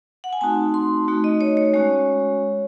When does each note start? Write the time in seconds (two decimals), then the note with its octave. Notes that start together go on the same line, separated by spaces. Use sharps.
0.24 F#5
0.33 G#5
0.41 A3 C4 D#4 F#4 A5
0.74 C6
1.08 A3 D#4 F#4
1.24 D#5
1.41 C#5
1.57 C#5
1.74 G#3 C#4 F#4 C#5